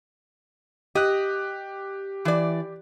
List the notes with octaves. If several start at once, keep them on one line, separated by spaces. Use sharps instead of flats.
G4 D#5 F#6
E3 D5